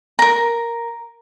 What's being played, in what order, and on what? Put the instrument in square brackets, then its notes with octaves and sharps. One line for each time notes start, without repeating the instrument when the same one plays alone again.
[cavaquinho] A#4 A#5